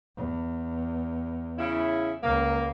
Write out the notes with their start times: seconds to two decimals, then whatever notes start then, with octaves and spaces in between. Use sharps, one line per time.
0.17 E2
1.58 C#3 E4
2.23 C#2 A#3